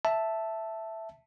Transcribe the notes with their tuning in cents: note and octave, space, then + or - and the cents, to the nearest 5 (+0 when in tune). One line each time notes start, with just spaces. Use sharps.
E5 +0 A5 +0